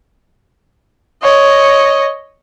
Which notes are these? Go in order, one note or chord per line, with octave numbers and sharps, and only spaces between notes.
C#5 D#5